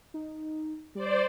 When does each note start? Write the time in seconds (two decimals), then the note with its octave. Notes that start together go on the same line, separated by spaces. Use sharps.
0.14 D#4
0.95 G3 C5 D5